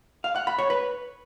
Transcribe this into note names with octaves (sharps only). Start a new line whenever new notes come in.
F5
F#5
B5
C#5
B4